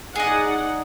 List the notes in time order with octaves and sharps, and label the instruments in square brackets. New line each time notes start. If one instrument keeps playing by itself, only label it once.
[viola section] D#4 D5 F#5 [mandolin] G#4 D#5